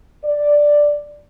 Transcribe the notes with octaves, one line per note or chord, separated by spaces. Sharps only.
D5